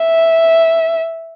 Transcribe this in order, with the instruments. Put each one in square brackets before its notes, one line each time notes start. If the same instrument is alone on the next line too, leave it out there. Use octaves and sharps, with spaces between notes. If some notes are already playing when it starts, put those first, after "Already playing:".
Already playing: [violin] E5